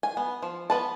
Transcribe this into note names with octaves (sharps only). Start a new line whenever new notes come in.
G#5
B3
F3
B3 B4 A5